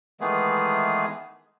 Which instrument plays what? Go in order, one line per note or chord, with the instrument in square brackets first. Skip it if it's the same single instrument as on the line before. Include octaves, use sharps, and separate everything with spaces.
[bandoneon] D#3 E3 G#3 A3 B3 G#4